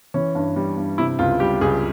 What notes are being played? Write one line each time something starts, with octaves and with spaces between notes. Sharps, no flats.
E3 C#4
G2
G3
G2
C3 E4
C#2 F4
G3 G4
C#2 G#4